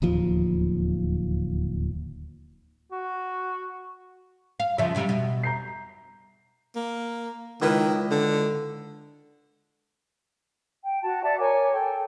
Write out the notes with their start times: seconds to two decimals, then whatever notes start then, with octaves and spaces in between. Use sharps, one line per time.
0.02 D1 D#2 F3
2.92 F#4
4.60 F5
4.78 C#3 F3 E5
4.95 F#2 C3 G3
5.09 B2
5.43 A#5 G6 C7
6.76 A#3
7.62 C#2 D#3 E4 B4
8.11 D3
10.84 G5
11.03 F#4 A5
11.22 D5 E5 F#5 A5
11.38 A#4 C#5 G#5 D6
11.72 A4 G5